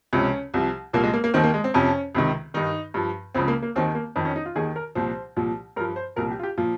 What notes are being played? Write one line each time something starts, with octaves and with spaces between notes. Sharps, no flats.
C#2 C3 F3 C#4
C2 C3 F3
C2 A#2 F3 A#3
G#3
A#3
A#3
D#2 D#3 C4
A#3
G#3
C4
F2 C3 F3 C#4
C#2 C3 D#3
G2 D#3 D#4
G2 F3
C#2 C#3 F3 C4
A#3
A#3
D#2 D#3 C4
A#3
F2 D#3 C4
C#4
D#4
F4
D#2 D#3 G#4
A#4
C2 A#2 F3 C5
C2 A#2 F3
G2 F3 A#4
C5
C2 A#2 F3 A#4
G4
F4
G4
A#2 F3 F4